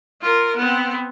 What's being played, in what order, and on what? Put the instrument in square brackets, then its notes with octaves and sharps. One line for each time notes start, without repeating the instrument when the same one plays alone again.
[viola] F4 A#4
B3 C4